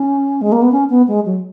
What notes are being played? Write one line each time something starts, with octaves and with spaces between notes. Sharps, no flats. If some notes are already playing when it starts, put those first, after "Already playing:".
Already playing: C#4
G#3
A#3
B3
C#4
B3
G#3
F#3